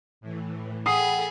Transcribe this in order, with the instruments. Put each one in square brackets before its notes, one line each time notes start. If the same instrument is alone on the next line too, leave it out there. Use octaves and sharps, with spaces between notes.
[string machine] A2 E3
[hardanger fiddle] G#4 [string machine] A4 B5 [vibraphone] F#5 G5 [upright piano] D#6 C7